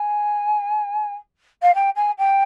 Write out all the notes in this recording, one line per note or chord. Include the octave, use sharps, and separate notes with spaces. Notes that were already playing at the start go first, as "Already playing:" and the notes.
Already playing: G#5
F5
G5
G#5
G5